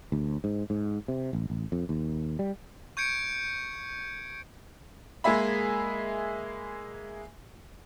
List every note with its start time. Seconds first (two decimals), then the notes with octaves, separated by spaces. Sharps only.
0.12 D2
0.44 G#2
0.70 G#2
1.08 C3
1.33 A1
1.50 A1
1.72 F2
1.89 D#2
2.39 G3
2.97 C#6 G6 G#6 C#7 D7
5.24 G#3 A#3 G#4 E5 B5